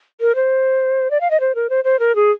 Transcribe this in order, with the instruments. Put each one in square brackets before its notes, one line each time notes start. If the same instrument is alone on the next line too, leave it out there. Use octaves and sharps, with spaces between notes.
[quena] A#4
C5
D5
F5
D#5
C5
A#4
C5
C5
A#4
G#4